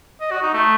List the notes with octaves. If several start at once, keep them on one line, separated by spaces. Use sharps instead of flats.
D#5
F#4
D#4
A3